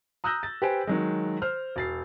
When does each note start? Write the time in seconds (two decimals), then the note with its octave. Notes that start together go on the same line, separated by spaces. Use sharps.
0.24 A#5 D#6 E6 F#6 G6 A#6
0.43 A6
0.62 G4 B4 C5 G#5 D7
0.87 D#3 F#3 G#3
1.42 C5 F6
1.76 E1 A6 C7